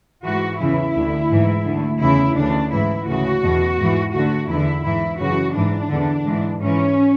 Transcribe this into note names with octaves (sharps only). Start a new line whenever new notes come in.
G#2 E3 F#4
E2 C#3 E3 E4
D2 D3
G#2 E3
D3
D2
E2 C#3 E3 E4
D2 C#3 E3 D4
G#2 E3 E4
D2 C#3 E3 F#4
E2 B2
G#2 E3
D2 D3 F#4
E2 D3 E4
G#2 E3 E4
F#2 C#3 E3 F#4
G#2 E3 D4
E2 D3
G#2 E3
G#2 E3 C#4